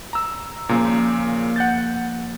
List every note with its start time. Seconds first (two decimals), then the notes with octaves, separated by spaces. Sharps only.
0.13 A#5 E6
0.69 A#2 C#3 F3 A#3 A#5
1.56 F#5 G6 A6